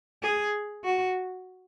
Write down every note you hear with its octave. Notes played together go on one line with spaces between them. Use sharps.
G#4
F#4